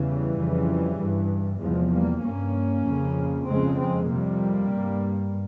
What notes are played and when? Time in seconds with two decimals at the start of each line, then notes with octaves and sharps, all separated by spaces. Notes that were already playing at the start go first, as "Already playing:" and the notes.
Already playing: E2 C#3 E3 G3
0.36 F2 C#3
0.98 G2
1.60 E2 C3 F3 G#3
1.91 G3 A#3
2.22 G2 A#3 C#4
2.85 F2 C#3
3.47 F2 C#3 G#3 C4
3.78 G#3 C4
4.09 F2 C3 G3 A#3
4.71 G2